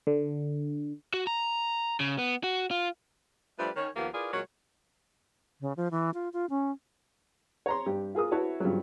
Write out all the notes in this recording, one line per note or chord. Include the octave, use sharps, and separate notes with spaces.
D3
F#4
A#5
C#3
B3
F#4
F4
F3 G3 A3 D4 B4 C5
D#3 C#4 C#5
D#2 F3 A#3 B3 F4 G4
E4 F4 G#4 A#4 B4 D5
A#2 F#3 G#3 A#4 C#5
C#3
F3
E3
F4
F4
C#4
C#5 A#5 C6
G2 G4
F4 G#4 A#4 D#6
E4 F#4 B4 C#5 E5 A5
G2 C#3 F3 F#3